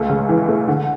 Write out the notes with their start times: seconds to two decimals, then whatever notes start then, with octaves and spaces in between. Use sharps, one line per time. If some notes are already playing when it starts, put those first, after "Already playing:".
Already playing: C#2 A3
0.09 C#3
0.29 E3
0.49 A3
0.68 D3